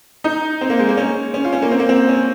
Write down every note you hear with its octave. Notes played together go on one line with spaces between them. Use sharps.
D#4
C4
A#3
G#3
A#3
C#4
C#4
F4
C#4
A#3
C4
A#3
C4
C#4